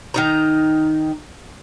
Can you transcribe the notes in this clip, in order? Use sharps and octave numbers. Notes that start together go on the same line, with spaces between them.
D#3 D#4 A#5